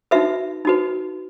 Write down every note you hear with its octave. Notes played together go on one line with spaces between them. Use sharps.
D#4 F#4 B4 E5
D#4 F#4 B4